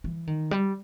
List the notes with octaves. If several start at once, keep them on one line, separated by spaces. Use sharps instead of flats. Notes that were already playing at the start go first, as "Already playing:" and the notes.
E3
D#3
G3